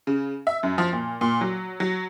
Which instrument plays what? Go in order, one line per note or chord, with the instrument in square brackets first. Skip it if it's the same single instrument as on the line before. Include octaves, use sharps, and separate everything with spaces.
[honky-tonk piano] C#3
E5
F#2
F3
A#2
A#2
F#3
F#3